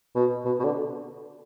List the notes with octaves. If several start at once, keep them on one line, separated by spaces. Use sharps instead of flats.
B2
B2
B2
D3